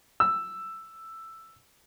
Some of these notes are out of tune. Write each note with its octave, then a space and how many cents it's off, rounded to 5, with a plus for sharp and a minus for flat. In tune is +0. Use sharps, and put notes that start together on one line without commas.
E6 +5